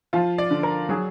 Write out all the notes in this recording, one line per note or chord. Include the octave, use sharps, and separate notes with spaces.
F3 F4
D5
D3
A#4
F#3 G#4